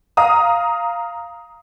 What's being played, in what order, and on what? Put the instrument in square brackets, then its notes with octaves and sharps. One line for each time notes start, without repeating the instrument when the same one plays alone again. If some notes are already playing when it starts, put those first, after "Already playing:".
[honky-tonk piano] F5 A#5 D#6